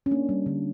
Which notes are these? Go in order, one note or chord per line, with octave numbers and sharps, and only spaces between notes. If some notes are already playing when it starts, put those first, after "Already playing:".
C#4
A#3 D4
G3
D3